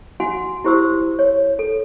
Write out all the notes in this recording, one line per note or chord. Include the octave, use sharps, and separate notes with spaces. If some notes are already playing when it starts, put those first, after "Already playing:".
F#4 F#5 G#5 C6
E4 G4 C5 C6 E6
C#5
A4